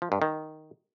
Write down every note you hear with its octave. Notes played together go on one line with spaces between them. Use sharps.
F3
G2
D#3